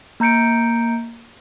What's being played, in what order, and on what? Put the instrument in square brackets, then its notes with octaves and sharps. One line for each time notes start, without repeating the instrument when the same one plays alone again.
[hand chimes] A#3 A#5 G6 C#7 D7